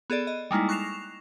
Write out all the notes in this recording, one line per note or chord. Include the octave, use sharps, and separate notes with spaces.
B3 G#4 A4 D5
D#5
G3 G#3 A#3 D#4 E4
C#6 F#6 A#6 C7 E7 F7